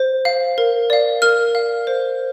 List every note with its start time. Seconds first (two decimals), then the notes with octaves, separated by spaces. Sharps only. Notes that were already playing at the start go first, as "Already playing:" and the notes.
Already playing: C5
0.25 F5
0.58 A#4
0.90 D5 F5
1.22 A#4 F6
1.55 F5
1.87 C5